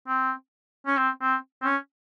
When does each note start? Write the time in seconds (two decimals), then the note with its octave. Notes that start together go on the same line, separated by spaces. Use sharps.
0.08 C4
0.87 C#4
0.97 C4
1.21 C4
1.62 C4
1.64 C#4